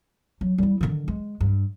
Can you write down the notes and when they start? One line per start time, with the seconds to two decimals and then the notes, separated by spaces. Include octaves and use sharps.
0.41 F#3
0.58 G3 E4
0.81 D3 D#3
1.08 G#3
1.41 G2